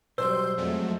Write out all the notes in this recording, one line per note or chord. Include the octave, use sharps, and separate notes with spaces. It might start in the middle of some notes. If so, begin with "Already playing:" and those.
B2 F#3 G3 C5 C6 E6 G6
F2 F#3 G#3 A3